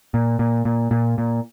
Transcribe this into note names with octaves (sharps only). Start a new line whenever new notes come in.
A#2
A#2
A#2
A#2
A#2